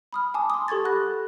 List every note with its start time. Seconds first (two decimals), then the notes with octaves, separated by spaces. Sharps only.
0.13 B5 D#6 F6
0.34 G#5 A5 D6 D#6
0.50 C6 D#6
0.68 G4 A4 C#6 G#6 A6
0.84 F#5 B5 F#6 A#6